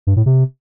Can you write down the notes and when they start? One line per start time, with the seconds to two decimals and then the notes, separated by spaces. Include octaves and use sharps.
0.07 G2
0.16 A2
0.26 C3